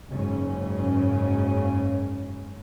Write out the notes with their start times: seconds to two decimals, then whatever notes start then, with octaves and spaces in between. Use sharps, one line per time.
0.10 F#1 G#2 C#3 C#4